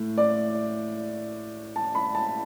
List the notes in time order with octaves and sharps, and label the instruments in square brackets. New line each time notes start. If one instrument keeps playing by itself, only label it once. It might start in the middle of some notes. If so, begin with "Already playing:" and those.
Already playing: [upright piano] A2 A3
D5
A5
B5
A5